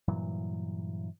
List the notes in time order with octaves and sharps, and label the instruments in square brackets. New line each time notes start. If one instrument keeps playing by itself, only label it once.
[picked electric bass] G2 A#2 E3 F#3